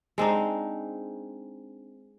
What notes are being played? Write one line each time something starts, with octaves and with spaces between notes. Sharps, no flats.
G#3 C4 D4 D#4